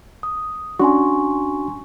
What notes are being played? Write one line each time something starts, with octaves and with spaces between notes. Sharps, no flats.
D#6
C#4 D4 F#4 G#5 C6 C#6